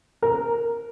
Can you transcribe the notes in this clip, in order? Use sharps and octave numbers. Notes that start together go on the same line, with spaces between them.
A#4